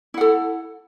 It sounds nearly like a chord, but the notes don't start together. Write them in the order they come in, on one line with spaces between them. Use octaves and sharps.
E4 F#5 A4